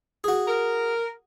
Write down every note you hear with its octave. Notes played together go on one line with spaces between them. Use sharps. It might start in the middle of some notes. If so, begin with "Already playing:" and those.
F#4 G#4
A#4